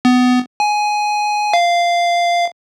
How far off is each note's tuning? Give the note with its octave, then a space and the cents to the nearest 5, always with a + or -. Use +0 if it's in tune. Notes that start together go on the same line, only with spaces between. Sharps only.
B3 +20
G#5 +10
F5 -10